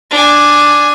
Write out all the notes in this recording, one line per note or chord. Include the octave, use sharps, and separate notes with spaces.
D4 G#5